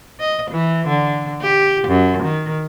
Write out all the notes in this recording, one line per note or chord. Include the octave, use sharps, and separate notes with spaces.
D#5
E3
D3
G4
F#2
D#3